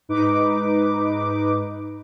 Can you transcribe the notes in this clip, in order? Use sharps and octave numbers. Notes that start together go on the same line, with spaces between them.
G#2 D#4 B4 D6